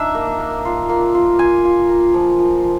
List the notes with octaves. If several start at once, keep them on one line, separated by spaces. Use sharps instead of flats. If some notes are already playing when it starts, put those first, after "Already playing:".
Already playing: D4 D#4 E5
A#3
A#3
F4
A#3
F4
F4 G#5
F4
A#3
F3
F3
F3